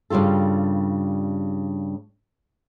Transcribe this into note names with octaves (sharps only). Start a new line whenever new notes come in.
G2 C#3 G3 F4 A4